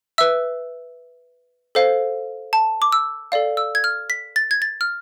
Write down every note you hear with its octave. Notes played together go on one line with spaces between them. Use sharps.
B4 E5 E6
A4 C5 F5
A5
D6
E6
A4 D5 F5
E6
G#6
F6
B6
A6
G#6
A6
F6